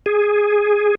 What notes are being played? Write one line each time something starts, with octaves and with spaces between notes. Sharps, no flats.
G#4